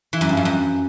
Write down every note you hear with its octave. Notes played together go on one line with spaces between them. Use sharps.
E3
F#2
G2
F2
F#2